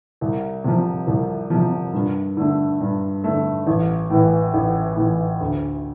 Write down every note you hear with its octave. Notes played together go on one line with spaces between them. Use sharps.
C2
C3 F3
C2
C3 F3
G2
D3 A3
G2
D3 A3
A1
A2 E3
A1
A2 E3
D2